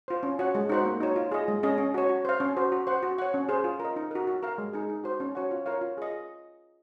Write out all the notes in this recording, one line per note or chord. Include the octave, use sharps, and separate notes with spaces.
F4 C5
C#4
F#4 C#5 F#5
G#3
D#4 F#4 C5 F#5
A#3
D#4 F#4 C#5
F4
G#4 D#5
G#3
C#4 G#4 D#5
C#4
F#4 C#5
F#4
C5 F5
C#4
F#4 C5
F#4
C5 F#5
F#4
C#5 F#5
C#4
G#4 C5
F4
A#4 D#5
D#4
F#4 A#4
F#4
A#4 F5
G#3
D#4 G#4
D#4
F#4 C5
C#4
F#4 C#5 F#5
F4
A#4 C#5 F5
F4
G#4 D#5